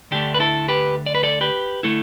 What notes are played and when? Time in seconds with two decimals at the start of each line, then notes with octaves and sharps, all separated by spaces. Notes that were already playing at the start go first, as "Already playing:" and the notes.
0.11 D2 D3 A3 D4 G4
0.34 B4
0.40 E4 A4
0.68 G4 B4
1.06 D5
1.15 B4
1.23 A4 D5
1.41 G4 B4
1.83 D3 A3 E4 A4